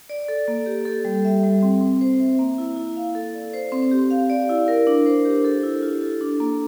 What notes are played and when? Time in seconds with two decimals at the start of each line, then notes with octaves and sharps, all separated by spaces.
0.10 D5
0.28 A4
0.48 A#3
0.66 G4
0.85 A4
1.05 G3
1.25 E5
1.43 G3
1.63 C4
1.81 C4
2.01 C5
2.20 E5
2.39 A#3
2.58 E4
2.76 E4
2.97 F5
3.15 A4
3.34 D5
3.53 C5
3.72 C4
3.91 G4
4.11 F5
4.30 D5
4.49 E4
4.68 A#4
4.87 D4
5.06 C5
5.25 G4
5.45 A4
5.63 E4
5.82 F4
6.01 A4
6.21 D4
6.40 A#3